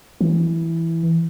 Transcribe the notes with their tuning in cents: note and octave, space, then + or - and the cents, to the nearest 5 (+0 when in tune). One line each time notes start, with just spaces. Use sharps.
E3 +0